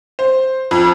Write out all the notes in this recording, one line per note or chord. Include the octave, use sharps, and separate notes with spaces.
C5
F2